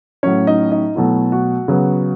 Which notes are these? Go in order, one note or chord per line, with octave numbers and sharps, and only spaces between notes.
A2 F#3 C#4 C#5
D#4 D#5
D#4 D#5
B2 F#3 A3 E4
F#4
C#3 F#3 B3